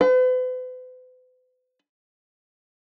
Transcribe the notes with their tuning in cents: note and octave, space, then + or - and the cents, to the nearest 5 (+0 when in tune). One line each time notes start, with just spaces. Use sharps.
B4 +45